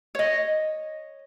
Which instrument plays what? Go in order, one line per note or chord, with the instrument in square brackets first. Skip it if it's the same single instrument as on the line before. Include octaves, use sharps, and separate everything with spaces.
[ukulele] C#5 D#5